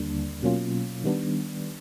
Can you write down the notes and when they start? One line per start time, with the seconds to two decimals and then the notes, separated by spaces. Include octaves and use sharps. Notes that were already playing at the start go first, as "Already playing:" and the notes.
Already playing: D#2 D3 G3 A#3 D4
0.42 B2 F#3 A#3 C#4 F4
1.04 D#3 G3 B3 D4